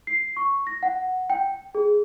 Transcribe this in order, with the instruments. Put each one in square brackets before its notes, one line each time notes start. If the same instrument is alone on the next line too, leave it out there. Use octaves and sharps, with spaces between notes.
[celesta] C7
C#6
A#6
F#5
G5
G#4